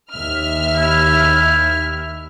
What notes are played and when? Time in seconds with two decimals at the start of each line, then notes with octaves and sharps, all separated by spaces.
0.12 D#2 E5 F6
0.76 E4